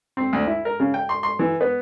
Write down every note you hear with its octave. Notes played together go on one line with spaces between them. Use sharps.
C4
D2
E4
A#4
C#3
G5
C6
C6
E3
B3